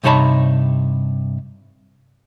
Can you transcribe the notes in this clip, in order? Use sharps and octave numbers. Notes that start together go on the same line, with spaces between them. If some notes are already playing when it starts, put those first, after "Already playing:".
G2 C3 D#4 C#5 A5 B5